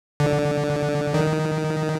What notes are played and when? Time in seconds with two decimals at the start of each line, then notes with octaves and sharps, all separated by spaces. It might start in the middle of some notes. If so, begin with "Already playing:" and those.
0.20 D3
1.14 D#3